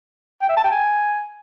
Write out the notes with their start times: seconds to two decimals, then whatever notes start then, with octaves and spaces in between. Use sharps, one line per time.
0.42 G5
0.49 E5
0.57 A5
0.64 G5
0.71 G#5